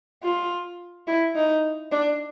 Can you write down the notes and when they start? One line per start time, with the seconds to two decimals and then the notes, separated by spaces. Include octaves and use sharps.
0.23 F4
1.08 E4
1.35 D#4
1.92 D4